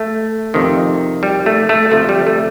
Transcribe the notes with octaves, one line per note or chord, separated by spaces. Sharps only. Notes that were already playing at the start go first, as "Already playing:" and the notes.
Already playing: A3
F2 C3 D#3
G3
A3
A3
D2 C3 F3 A3
G3
A3